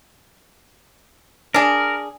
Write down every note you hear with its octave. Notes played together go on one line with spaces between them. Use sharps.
D4 G#4 A#4